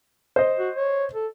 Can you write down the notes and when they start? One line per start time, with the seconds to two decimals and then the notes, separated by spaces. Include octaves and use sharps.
0.36 C5 D#5
0.59 F#4
0.77 C#5
1.14 A4